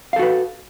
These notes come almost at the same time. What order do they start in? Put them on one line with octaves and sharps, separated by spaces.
F5 A4 F#4 B4